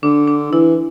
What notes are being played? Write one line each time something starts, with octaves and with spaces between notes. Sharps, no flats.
D3 D4
D4
E3 E4